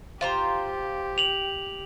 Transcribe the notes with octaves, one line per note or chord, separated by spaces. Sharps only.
F4 G4 C5 A#5
F7 F#7